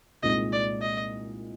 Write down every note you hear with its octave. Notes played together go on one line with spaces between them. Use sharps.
C2 A#2 G#3 D#4 D#5
D5
D#5